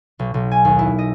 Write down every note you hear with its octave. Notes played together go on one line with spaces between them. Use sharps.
B1
B1
G#5
D#2
E4
D#5